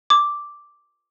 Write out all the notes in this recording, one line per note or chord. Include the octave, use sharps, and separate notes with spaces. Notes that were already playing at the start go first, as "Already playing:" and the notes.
D6